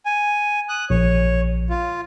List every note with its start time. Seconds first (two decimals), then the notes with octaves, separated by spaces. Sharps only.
0.06 G#5
0.69 D#6 F#6
0.90 A#1 C#5
1.70 F4